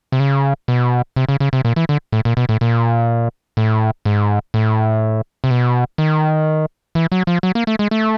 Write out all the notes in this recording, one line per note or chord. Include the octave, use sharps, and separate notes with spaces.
C3
C#3
B2
C3
C#3
C#3
C3
A#2
E3
D3
A2
A#2
B2
A2
A#2
A2
G#2
A2
C3
B2
D#3
E3
F#3
F3
F#3
A#3
A3
G#3
A3